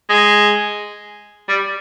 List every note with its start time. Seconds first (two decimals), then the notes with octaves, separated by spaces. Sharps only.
0.09 G#3
1.49 G3